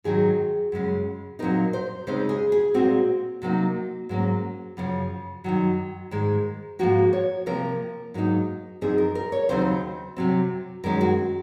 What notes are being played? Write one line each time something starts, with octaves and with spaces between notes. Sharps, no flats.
G#2 D#3 F#3 G#4
F#2 C#3 G#3 C#4
A#2 F#3 C4 D#4 A#4
C5
C#3 G#3 C4 D#4 C5
G#4
G#4
A#2 G#3 C4 F#4
C3 F#3 A#3 D#4
G#2 F#3 A#3 C#4
F#2 C#3 F3
F#2 D#3 F#3
G#2 D#3 G#3
G#2 F3 A#3 F#4
C#5
C3 F3 A#3 A#4
G#2 F#3 A#3 D#4
F#2 F3 C4 D#4 G#4
A#4
A#4
C#5
D#2 C#3 F#3 C4 D#4 C5
C3 F#3 C4
F#2 D#3 G#3 C#4 A#4
F#4